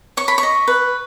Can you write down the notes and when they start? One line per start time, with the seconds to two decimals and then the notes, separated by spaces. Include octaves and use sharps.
0.17 C#5 C#6
0.28 B5
0.38 C#6
0.43 D#5
0.68 B4